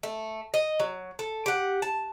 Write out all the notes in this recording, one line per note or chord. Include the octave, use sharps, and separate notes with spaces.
A3
D#5
F#3
A4
G4 F#5
A5